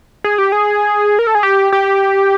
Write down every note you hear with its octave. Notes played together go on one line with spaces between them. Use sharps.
G#4
G4
G#4
A#4
A4
G#4
G4
G4